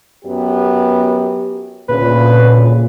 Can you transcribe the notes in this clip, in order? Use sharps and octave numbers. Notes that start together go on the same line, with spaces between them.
F#2 B3 G4
D2 A#2 C#3 B4